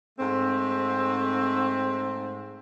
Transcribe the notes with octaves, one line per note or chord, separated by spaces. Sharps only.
G#2 A3 C4